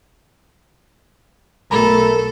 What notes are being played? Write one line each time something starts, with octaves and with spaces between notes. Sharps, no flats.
B1 B2 A3 A4 A#4 A#5 B5